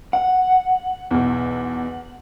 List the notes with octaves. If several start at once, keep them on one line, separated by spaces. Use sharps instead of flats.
F#5
B1 E2